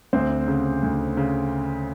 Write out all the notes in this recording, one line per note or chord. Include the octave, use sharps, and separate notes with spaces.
D2 C4 C5
C#3
D2
C#3